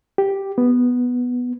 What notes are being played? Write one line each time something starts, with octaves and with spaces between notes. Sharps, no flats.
G4
B3